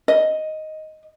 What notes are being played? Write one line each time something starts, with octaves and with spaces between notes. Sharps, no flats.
D#5